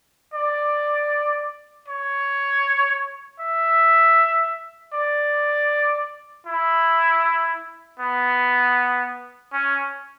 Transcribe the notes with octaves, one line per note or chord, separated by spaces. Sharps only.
D5
C#5
E5
D5
E4
B3
C#4